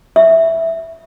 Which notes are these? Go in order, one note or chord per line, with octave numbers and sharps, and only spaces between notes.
E5